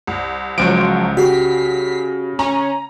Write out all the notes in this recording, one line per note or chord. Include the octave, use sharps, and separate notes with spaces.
C2
C#2 F3 F#3 D7
C#3 F#4 G4 B6 C7
C#4 A#5